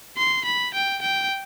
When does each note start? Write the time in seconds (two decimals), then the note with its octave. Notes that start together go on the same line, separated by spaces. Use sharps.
0.17 C6
0.44 B5
0.74 G5
1.02 G5